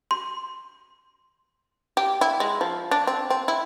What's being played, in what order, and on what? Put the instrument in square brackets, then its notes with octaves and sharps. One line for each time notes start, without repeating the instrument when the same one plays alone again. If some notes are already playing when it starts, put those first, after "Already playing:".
[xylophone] C6
[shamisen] G4
E4
G#3
F3
D4
C4
C4
E4